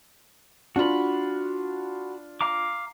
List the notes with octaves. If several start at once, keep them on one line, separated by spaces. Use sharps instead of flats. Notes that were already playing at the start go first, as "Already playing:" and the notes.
D4 F4 F#4 B5
F5 A#5 D6